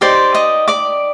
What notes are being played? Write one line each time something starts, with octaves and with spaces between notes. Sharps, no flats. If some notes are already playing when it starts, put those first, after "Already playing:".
D#4 G4 C5 D5 C6
D#5 D#6
D5 D6